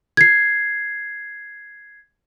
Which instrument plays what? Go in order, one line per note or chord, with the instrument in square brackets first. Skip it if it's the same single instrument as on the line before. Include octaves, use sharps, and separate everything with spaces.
[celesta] G#6 C7